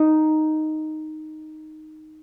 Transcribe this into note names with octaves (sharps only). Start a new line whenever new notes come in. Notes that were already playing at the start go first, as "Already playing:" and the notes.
Already playing: D#4